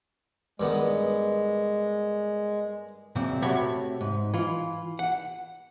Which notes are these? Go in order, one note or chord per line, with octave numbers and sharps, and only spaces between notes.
G2 D#3 G#3 B3
F#2 A#2 C#3 C4
C3 A3 F#4 C#5 B5
G#2
E3 F4
F#5